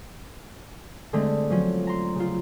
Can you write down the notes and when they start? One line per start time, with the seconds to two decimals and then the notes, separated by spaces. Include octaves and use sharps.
1.13 D3 G#3 A3 C4
1.50 F3 F#3 C#4
1.87 A#5 C6
2.16 C#3 F4